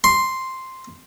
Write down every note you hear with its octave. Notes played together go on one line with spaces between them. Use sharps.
C6